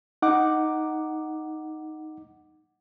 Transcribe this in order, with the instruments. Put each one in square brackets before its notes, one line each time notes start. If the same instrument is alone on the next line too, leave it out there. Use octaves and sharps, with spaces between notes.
[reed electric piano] D#4 F#5 D6